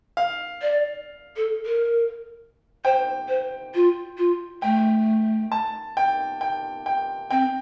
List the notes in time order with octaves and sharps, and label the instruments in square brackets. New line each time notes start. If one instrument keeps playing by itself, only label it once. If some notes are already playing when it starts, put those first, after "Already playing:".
[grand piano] F5
[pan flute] D5
A4
A#4
[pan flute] C5 [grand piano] G5
[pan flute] C5
F4
F4
[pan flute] A3 [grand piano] G5
[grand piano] A5
G5
G5
G5
[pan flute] C4 [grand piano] G5